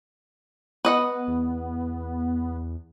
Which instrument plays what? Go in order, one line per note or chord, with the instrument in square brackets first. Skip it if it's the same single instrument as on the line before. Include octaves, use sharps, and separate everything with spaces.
[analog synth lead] B3 [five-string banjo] B4 D#5 F#5
[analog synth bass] E2